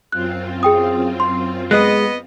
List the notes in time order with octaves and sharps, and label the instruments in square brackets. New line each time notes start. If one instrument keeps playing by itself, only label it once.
[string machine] F#2 C4 F4 [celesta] F#6
[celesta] G#4 G5 D#6
C6
[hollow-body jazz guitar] G#3 [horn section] B3 D#5 [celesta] F#6